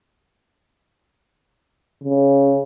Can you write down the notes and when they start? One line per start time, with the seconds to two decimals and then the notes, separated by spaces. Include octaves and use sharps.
2.03 C#3